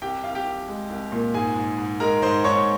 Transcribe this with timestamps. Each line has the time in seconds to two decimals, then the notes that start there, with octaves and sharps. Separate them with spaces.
0.02 C2 G4 G5
0.24 C2 F5
0.35 G4 G5
0.46 C2
0.68 G#3
0.90 C2
1.12 A#2
1.34 G#2 G#4 G#5
1.56 G#2
1.78 G#2
2.00 G#3 A#4 A#5
2.22 G#2 C5 C6
2.44 G#2 C#5 C#6